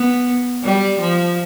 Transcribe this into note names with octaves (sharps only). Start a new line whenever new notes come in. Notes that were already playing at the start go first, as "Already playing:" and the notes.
Already playing: B3
G3
F3